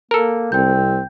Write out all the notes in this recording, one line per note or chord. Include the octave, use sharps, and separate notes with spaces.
A#3 A4 A#4
C2 C4 G5 G6